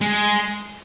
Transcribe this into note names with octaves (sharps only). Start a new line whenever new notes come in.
G#3